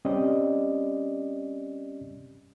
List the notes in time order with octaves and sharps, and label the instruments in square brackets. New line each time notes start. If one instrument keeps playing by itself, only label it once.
[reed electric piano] G3 C4 C#4 G4 D5 D#5